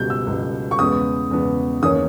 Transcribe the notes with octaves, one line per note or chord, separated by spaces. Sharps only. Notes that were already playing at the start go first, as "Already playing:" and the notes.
Already playing: C#2 B2 G3 G6
E6
C#2 B2 G3
C#6
E2 C#3 G#3 B3 D#6
E2 C#3 G#3 B3
E2 D#3 A#3 C#4 D#6